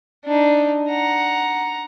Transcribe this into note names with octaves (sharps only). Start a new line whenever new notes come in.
D4 D#4
F#5 A#5